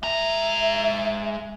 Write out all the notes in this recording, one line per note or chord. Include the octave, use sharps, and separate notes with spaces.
G#3 E5 A#5